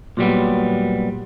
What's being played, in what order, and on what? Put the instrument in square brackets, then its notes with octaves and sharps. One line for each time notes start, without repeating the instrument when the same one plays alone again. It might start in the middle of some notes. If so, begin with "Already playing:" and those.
[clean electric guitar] A#2 F#3 G3 B3